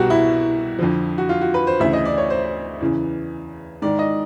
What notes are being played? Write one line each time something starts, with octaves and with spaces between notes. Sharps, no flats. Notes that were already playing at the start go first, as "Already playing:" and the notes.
Already playing: C2 B2 F#4 G4
E4
F2 D3 F3
F#4
F4
F#4
B4
C5
D2 C#3 E3 E5
D#5
D5
C#5
C5
E2 C#3 E3
G#2 D#3 D5
D#5